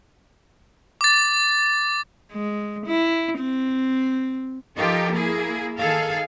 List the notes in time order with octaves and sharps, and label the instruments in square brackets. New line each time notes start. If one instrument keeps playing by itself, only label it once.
[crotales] D6 A6
[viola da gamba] G#3
E4
C4
[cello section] F3 D#4 F4 G4 A4 A#4
A#3 E4 G#4
D#3 G#4 A4 F5